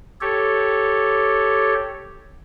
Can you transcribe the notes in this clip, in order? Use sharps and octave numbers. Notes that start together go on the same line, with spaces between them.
G4 A4 C#5